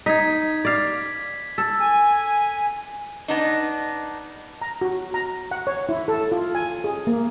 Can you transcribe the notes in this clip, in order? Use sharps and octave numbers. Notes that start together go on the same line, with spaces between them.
D#4 G#6 B6
D5 F5
A4
G#5
B3 D4 D#4
A#5
F#4
A#5
F#5
C#5
E4
A4
F4
G#5
G#4
A#3